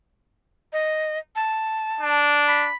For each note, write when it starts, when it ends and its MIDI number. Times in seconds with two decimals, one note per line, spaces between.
0.73 1.19 75
1.36 2.17 81
2.01 2.68 62
2.47 2.75 83